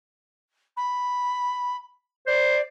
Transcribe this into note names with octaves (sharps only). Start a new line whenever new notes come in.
B5
C5 D5